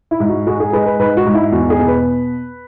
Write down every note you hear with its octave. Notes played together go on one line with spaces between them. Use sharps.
E4
G#2
F#4
G#3 F#4
G#4
G#3 B4
B4
G#2 B4
F#4
G#2
E4
E2 F#4
G#4
B2
B4